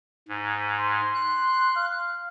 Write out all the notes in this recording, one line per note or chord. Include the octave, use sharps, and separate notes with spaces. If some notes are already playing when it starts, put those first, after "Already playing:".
G#2
C6
F#6
F5